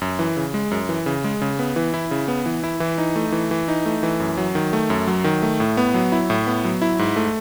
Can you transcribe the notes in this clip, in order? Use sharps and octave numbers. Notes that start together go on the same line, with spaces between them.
F#2
E3
C#3
G#3
F#2
E3
C#3
G#3
C#3
B3
E3
E4
C#3
B3
E3
E4
E3
D#4
A3
E3
E3
D#4
A3
E3
F#2
F#3
D#3
A3
F#2
F#3
D#3
A3
A2
B3
F#3
E4
A2
B3
F#3
E4
G#2
A3